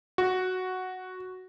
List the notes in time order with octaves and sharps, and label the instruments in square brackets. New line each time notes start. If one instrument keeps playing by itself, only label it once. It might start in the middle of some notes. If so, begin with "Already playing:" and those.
[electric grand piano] F#4